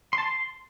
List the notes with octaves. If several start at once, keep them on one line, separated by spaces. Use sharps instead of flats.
C6
A5
C6